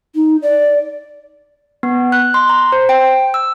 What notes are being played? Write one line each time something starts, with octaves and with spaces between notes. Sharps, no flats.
D#4
D5
B3
F#6
C6
A#5
C5
G5
E6